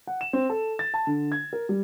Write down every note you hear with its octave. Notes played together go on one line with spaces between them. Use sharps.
F#5
E7
C4
A4
A6
A5
D3
G#6
A#4
G3